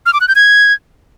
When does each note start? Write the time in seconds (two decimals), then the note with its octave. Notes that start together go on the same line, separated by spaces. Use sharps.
0.06 F6
0.13 D6
0.21 F#6
0.28 G6
0.36 G#6